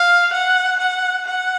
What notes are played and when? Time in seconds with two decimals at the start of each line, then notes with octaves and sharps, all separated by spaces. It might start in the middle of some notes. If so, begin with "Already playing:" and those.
Already playing: F5
0.33 F#5
0.80 F#5
1.28 F#5